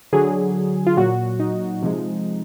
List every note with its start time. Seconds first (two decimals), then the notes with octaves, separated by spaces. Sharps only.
0.13 D3 F#3 G#4
0.87 F4
0.97 A#2 F#3 F#4
1.40 D#4
1.83 C3 F3 G#3